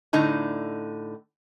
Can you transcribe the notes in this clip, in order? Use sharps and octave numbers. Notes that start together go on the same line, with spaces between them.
A2 D3 D#4 A#5